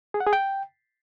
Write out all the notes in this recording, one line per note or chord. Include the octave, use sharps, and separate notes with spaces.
G#4
F#5
G#4
G5